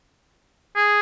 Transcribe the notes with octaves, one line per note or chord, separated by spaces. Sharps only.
G#4